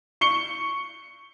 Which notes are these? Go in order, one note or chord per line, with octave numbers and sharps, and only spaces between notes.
C#6 C#7 G7